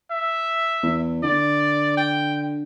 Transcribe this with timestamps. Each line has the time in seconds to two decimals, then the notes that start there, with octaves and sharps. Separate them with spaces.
0.11 E5
0.83 E2
1.23 D3 D5
1.97 G5